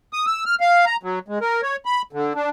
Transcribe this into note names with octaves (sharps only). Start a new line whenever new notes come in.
D#6
E6
F6
F5
A#5
F#3
G#3
A#4
C#5
B5
D3
D4